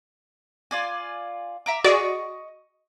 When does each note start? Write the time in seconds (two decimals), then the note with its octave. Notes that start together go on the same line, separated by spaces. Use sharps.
0.71 F4 D5 G#5
1.66 E5 A#5 D6
1.84 F#4 G#4 D5 D#5 C#6